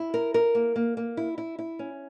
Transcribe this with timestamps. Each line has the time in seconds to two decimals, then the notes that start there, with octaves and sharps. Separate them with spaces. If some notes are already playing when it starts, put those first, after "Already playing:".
Already playing: E4
0.14 A#4
0.34 A#4
0.55 A#3
0.76 A#3
0.97 A#3
1.17 E4
1.38 E4
1.59 E4
1.79 C#4